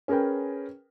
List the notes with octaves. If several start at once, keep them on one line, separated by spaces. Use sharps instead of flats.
C#4 G#4 A#4 B4 G5